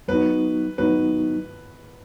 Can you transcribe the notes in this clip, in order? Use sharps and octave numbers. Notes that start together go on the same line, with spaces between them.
F#3 B3 D#4 F#4 B4
F#3 B3 D#4 F#4 B4